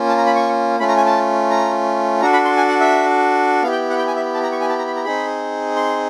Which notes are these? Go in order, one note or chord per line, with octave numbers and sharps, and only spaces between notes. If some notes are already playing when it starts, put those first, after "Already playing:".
Already playing: A#3 C#4 F4
A5
A#5
B5
C#6
A3 C#4 F4 B5
A#5
G#5
A5
A#5
D4 F#4 A4 A#5
B5
C6
G#5
F#5
E5
B3 E4 G4 F5
G5
F#5
G5
G#5
E5
A5
A#5
C#6
G#5
A5
A#5
B5
A#5
C4 D#4 G#4 B5
C6